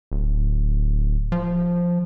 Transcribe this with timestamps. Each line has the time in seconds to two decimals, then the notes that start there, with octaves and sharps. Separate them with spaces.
0.12 D1
1.32 F3